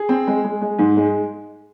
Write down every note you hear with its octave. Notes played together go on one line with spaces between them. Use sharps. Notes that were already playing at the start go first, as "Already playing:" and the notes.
Already playing: G#4
C4
G#3
G#3
G#3
G#2
G#3